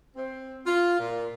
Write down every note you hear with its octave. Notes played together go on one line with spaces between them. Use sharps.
C4
F4
A#2